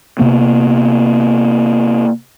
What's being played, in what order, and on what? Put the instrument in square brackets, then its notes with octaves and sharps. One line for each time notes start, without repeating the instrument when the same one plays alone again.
[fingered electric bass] C3 A#3 B3